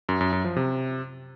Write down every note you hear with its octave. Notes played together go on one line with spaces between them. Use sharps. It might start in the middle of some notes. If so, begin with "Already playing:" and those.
F#2
F#2
F#2
F3
C3